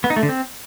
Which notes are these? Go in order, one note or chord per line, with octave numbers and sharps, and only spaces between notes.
B3
D#4
A3
D3
C4